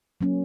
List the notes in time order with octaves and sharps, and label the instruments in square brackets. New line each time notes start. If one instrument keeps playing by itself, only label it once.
[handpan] F#3 A#3 C#4